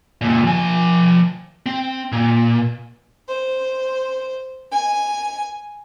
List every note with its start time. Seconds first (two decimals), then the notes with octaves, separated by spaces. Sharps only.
0.21 C#2 A#2
0.45 F3 G#5
1.66 C4
2.12 A#2
3.28 C5
4.71 G#5